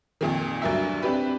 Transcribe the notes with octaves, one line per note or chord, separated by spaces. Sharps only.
F2 A#2 D#3
D2 G2 F#3 A#4 E5
C4 D4 G4 B4